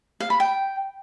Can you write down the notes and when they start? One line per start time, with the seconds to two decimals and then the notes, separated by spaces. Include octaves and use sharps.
0.20 F5
0.30 B5
0.40 G5